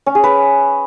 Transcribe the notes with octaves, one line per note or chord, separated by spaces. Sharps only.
C#4
G#4
B4